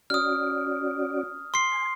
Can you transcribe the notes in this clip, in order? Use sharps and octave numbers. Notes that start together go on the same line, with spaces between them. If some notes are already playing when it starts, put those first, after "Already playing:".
C#4 F#4 D5 D#6 F6
C6 C7
G#5